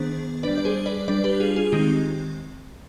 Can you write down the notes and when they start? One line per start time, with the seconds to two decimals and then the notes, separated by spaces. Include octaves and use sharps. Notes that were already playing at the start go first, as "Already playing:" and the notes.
Already playing: D#3 B3 D4 G#4 C5
0.43 G3 D4 B4 D5
0.58 D5
0.65 G#4 C5
0.86 B4 D5
1.08 G3 D4 B4 D5
1.24 G4 B4
1.40 F4 G#4
1.56 F4 G#4
1.72 D#3 G#3 C4 D#4 G4